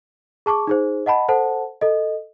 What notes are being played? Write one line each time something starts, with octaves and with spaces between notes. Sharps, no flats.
G#4 A5 C#6 D6
D#4 G#4 C5
D#5 F#5 A5 B5
A4 C5 F#5 A5
A4 D#5